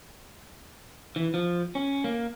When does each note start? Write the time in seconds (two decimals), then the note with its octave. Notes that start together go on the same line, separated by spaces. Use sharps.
1.16 E3
1.34 F3
1.75 C#4
2.04 A#3